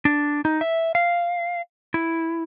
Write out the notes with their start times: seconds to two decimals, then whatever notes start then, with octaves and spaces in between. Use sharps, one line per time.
0.05 D4
0.45 D#4
0.61 E5
0.95 F5
1.94 E4